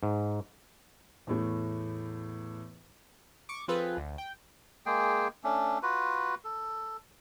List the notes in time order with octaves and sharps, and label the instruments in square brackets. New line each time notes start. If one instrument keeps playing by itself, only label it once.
[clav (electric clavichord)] G#2
[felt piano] E2 A2 A3
[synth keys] C#6 D6
F3 C4 F4 G#4 A4 B4
D2
G5
[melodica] G#3 A#3 G#4 G5
A3 C#4 D4
F4 F#4 B4
A4